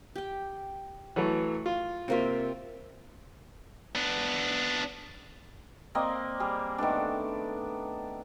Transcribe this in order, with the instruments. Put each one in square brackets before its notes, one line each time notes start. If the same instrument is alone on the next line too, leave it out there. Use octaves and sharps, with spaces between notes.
[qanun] G4 G5
[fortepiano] E3 F#3 A3
F4
[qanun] C3 A#3 E5 [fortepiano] C4 F4
[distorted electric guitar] B3 D4
[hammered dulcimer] A#3 C4 D5 D#5
G3 G#4
D#3 A3 B3 D4